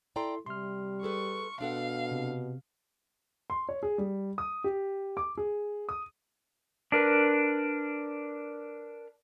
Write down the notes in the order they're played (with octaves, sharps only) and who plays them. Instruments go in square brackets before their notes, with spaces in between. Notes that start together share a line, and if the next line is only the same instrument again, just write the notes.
[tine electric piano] E4 A4 C6 [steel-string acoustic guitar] D5 G5 A#5
[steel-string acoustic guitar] C3 [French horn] G3 [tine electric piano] C6 F6
[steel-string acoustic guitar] G#4 A4 B4 [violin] C#6
[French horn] B2 [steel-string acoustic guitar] D4 A4 F#5 [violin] F5
[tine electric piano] C3
[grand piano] C6
C#5
G#4
G3
D#6
G4
D6
G#4
D#6
[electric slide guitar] D4 A#4 B4